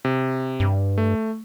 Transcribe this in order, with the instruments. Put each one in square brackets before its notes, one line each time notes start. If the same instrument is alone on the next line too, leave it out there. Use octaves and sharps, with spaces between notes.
[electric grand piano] C3
[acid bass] G2
[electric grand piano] A3